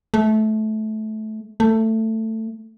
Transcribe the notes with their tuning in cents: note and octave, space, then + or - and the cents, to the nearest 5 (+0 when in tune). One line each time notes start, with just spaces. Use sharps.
A3 -20
A3 +15